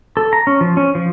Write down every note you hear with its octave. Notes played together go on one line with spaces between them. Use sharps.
A4
A#5
C#4
F3
C#4
F3